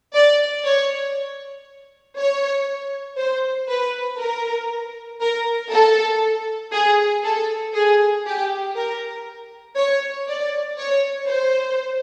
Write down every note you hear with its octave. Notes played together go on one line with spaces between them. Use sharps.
D5
C#5
C#5
C5
B4
A#4
A#4
A4
G#4
A4
G#4
G4
A#4
C#5
D5
C#5
C5